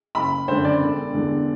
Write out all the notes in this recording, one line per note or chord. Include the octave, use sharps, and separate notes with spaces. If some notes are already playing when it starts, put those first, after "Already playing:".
F#1 B5
F#2 D3 C5
D5
E1
E2 D3